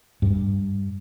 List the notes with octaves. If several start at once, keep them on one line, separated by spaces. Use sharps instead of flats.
G2